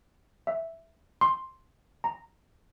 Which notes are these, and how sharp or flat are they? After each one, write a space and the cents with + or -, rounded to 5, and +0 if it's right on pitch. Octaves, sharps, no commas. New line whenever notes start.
E5 +0
C6 +5
A#5 -10